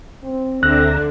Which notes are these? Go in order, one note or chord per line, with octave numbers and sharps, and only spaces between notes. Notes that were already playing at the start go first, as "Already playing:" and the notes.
C4
D2 D3 D4 E5 A#5 F#6